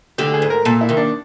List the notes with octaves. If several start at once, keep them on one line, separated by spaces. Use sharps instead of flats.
D2 D3 G4
G#4
G#2
A#4
A#2 A4
E4
D#2 D#3
D4